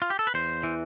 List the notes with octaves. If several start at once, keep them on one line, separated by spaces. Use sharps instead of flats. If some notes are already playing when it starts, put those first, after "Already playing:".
F4
G4
A4
B4
E2 C5
E3